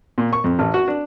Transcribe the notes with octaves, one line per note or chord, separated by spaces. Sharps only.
A#2
C#6
F2
A1
F#4
D4